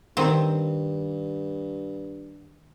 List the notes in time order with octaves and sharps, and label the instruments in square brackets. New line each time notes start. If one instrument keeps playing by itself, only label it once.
[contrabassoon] G2 [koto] D#3 C4